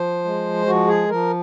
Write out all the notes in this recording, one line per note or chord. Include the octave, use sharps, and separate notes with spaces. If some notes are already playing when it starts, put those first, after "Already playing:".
Already playing: F3 C5
G#3
F3 F#4
G#4
F3 A#4